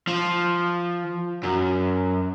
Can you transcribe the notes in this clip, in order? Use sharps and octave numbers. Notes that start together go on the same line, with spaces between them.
F3
F#2